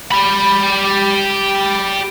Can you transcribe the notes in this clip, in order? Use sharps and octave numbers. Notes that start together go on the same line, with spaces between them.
G4 B5